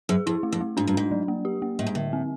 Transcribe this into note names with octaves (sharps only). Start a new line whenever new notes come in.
F#2 G#4
F2 E4
A3
F2
A3
G#2 D4
G2
G#2 D4
F#3
A#3
G4
A#3
A2 G3
G#2
A2 D3
C4